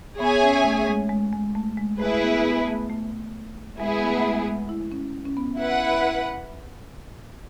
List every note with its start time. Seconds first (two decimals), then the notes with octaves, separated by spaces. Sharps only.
0.20 B3 G#4 C#5 E5 G#5
0.43 C#4
0.65 A3
0.88 G#3
1.10 G#3
1.33 G#3
1.55 A3
1.77 G#3
2.00 A3 E4 G#4 B4
2.23 B3
2.45 B3
2.68 A3
2.90 A3
3.79 G#3 B3 E4 G#4
4.02 A3
4.15 A3
4.24 G#3
4.47 G#3
4.69 E4
4.92 C#4
5.25 C#4
5.37 B3
5.58 E4 B4 F#5